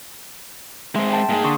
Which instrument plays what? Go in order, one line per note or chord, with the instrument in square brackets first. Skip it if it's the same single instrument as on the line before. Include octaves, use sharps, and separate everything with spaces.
[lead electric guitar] G#3 C4 [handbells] E5 C6
[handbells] G5 A5
[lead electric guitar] G#2 G#3 [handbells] A#3 G#4
[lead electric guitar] D3 [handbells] C6 C#6 D#6